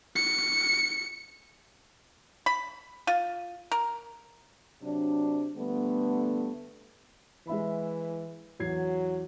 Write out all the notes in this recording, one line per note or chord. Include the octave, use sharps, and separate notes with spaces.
C#7
B5
F4
A#4
C3 F#3 D4
D3 G3 A3 B3
E3 G#3 E5 B5
E2 F#3 G#6 C7